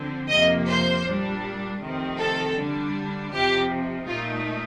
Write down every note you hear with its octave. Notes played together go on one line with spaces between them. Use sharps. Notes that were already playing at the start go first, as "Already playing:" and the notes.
Already playing: D3 F3 C4
F2 C3 F3 A#3 D#5
C5
A#2 G3 D4
F2 C3 D#3 A3 C4
A4
D3 G3 D4
F2 C3 F3 G4
A#2 A3 D#4 F4